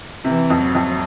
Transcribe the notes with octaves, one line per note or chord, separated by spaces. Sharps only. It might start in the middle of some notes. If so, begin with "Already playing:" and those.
C3 E3
F2
F#3
F2